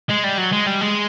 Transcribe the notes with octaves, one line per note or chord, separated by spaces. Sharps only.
G#3
G3
F#3
G#3
G3
G#3